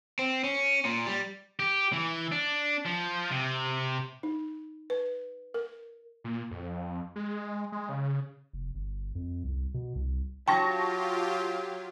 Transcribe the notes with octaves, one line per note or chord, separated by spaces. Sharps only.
C4
C#4
A#2
G3
G4
E3
D4
F3
C3
D#4
B4
A#4
A#2
F2
G#3
G#3
C#3
F1
G1
F2
C2
B2
C2
F#3 F4 G4 G5 A5 C#6 A#6